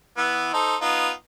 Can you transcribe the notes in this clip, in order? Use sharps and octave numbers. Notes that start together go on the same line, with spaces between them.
E3 B3
D#4 A4 C5
B3 D#4 F4